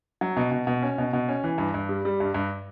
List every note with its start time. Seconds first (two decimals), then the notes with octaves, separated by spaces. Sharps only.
0.21 F#3
0.37 B2
0.52 B2
0.67 B2
0.82 C#4
0.98 B2
1.13 B2
1.28 C#4
1.44 E3
1.58 G2
1.74 G2
1.89 G3
2.05 G3
2.20 G2
2.34 G2